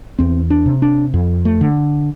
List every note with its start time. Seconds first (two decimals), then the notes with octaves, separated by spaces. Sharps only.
0.19 E2 C4
0.50 D4
0.66 C3
0.82 D4
1.14 F2
1.45 A3
1.61 D3